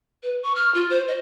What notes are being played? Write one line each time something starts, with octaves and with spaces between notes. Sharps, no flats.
B4
C#6
F6
F4
C5
D#5